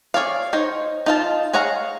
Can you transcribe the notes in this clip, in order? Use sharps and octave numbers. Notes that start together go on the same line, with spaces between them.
G#4 C#5 D5 F5
D#4 C5 C#5
D#4 F4 A5
G#4 C#5 F5 F#5 A#5